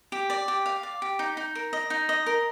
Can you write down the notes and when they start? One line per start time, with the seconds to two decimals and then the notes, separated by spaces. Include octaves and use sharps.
0.12 G4
0.30 D5
0.48 G4
0.66 F5
0.83 D5
1.02 G4
1.19 D#4
1.37 D#4
1.55 A#4
1.73 D#5
1.90 D#4
2.09 D#5
2.26 A#4